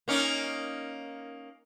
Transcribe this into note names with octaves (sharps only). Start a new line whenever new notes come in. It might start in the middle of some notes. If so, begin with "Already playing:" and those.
A#3 C#4 D#4